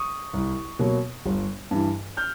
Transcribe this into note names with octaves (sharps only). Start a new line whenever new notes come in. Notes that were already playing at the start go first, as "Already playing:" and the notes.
Already playing: C#6 D#6
C2
B2 F#3 A#3
G1
G2 E3
F6 G6